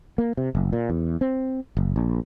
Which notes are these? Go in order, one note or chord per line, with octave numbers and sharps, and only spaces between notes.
A#3
C3
F#1
A#2
E2
C4
F#1
A#1